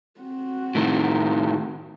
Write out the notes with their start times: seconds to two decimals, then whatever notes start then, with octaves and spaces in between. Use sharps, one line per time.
0.20 C4 F#4
0.75 A2 D#3